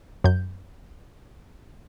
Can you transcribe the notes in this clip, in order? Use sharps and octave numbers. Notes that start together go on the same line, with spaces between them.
F#2 G6